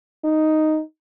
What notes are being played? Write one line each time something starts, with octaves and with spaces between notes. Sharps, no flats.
D#4